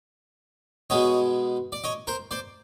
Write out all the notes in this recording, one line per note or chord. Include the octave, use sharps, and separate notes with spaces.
B2 G#3 B3 C#5 D#5
D5
C#5 D#5
A#4 C5
C5 D5